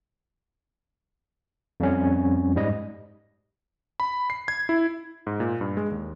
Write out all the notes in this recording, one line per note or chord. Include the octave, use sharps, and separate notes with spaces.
F2 G3 C#4
G#2 G3 D#5
B5
C7
G#6
E4
G#2
A#2
G2
G#3
D#2